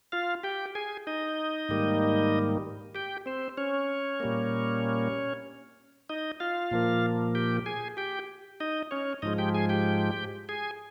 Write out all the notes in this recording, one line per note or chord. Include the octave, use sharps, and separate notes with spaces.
F4 F5
G4 G5
G#4 G#5
D#4 D#5
G#2 D#3 G3 A#3
G4 G5
C4 C5
C#4 C#5
A#2 G3 A#3
D#4 D#5
F4 F5
A#2 F3 A#3
G4 G5
G#4 G#5
G4 G5
D#4 D#5
C#4 C#5
G#2 F3 G#3 D#4 D#5
G4 G5
G#4 G#5
G4 G5
G#4 G#5